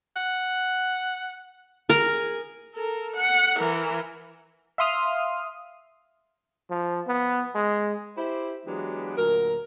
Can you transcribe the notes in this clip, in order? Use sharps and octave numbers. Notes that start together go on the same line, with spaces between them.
F#5
G#4 A#4
A4 A#4
F#5
E3 A#4
E5 F5 C6 D#6 F6
F3
B3
G#3
E4 G4 C5
E3 F#3 G#3 B3 D4 G4
D2 A#2 F#3 A#4